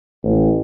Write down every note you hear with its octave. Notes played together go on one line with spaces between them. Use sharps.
A1